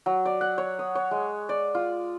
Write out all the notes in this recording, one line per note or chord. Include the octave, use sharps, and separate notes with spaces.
F#3
D5
F#5
C#5
D#6
C#5
G#3
D5
F4